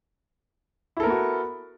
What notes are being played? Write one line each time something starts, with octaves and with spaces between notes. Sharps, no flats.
B3 E4 F#4 A4 A#4